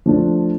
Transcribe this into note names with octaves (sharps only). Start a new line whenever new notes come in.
F3 A3 D4